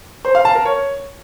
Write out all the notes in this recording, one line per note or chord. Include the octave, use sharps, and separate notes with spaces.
C5
F5
A5
A#4
C#5